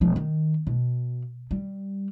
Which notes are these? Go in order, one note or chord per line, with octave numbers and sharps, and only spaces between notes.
E1 F3
D#3
B2
G3